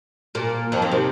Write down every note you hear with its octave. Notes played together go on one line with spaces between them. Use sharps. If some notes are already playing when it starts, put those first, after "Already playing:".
A#2 A#3
F2 F3
D#2 D#3
C3